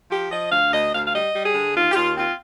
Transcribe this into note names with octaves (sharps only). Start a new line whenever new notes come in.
F3 G4
F3 D#5
D2 F5
D2 D#5
D2 F5
F5
G3 D#5
G3
G#4
D3
D#2 F4
G4
D#2 F4
C4 F4